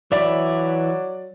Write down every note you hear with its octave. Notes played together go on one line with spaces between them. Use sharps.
E3 F#3 D5 E5 B5